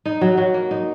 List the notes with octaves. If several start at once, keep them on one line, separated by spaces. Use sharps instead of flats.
D#4
F#3
F#3
A#3
D#4